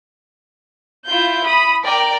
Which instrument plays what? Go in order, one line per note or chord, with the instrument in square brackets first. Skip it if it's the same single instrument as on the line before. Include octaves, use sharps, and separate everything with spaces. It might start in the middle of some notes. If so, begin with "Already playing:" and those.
[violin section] E4 F4 G6
B5 D#6
A#4 D5 G5 A#5